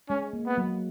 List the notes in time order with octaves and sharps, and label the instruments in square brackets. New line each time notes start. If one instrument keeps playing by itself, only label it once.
[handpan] G#3 [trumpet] C#4
[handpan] A#3
[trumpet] B3
[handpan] F#3